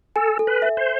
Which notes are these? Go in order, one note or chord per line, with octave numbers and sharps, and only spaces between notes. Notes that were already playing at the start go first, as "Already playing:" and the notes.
A4 G#5
A4
B4
E5
C5